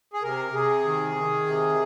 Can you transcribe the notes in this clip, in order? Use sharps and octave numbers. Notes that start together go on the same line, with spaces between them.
G#4
C3 A#4
C3 G#4
D#3
D#3
C3